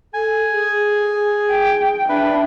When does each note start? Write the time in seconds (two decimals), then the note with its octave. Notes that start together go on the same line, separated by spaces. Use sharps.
0.14 A4 G#5
0.53 G#4
1.50 G5
2.09 D4 B4 E5